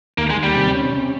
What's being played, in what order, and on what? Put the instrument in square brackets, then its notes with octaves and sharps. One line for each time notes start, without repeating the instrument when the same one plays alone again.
[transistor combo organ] D#2 [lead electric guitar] A#3
[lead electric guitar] G#3
[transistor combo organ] D#2
[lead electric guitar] G3
[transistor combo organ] C3
C#4
C3